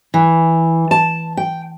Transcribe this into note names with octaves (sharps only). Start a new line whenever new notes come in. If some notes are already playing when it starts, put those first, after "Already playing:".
E3
A5
G5